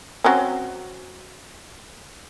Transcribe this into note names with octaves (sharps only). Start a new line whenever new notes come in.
F#3 C4 C#4